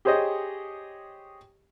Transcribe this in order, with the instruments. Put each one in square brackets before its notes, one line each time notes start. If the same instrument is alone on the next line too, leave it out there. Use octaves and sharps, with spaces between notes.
[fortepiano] G4 G#4 C5 C#5 D#5